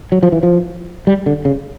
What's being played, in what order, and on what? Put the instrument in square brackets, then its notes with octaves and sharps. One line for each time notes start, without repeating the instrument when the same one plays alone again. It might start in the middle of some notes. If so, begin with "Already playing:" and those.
[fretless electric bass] F#3
F3
E3
F3
G3
D3
C#3